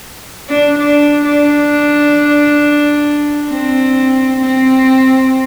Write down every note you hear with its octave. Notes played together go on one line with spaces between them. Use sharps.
D4
D4
D4
C4
C4